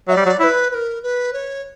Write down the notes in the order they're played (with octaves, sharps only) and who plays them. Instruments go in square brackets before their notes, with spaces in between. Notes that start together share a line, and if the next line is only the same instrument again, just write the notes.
[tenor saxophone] F#3 [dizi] E5
[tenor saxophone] G3 [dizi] D5
[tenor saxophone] F#3
[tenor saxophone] E4 [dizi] C#5
[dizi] B4
B4
A#4
B4
C#5